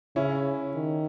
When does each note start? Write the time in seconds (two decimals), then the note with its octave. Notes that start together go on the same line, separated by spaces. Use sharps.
0.16 C#3 C#4 E4
0.75 D#3